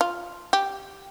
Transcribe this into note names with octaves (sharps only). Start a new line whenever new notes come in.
F4
G4